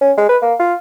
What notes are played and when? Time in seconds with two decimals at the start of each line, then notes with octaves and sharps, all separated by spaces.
0.01 C#4
0.17 G#3
0.29 B4
0.42 A#3
0.59 F4